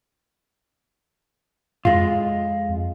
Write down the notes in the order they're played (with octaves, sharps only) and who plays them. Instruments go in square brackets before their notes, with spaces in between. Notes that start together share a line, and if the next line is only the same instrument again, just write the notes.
[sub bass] F2 [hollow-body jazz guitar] G#3 F4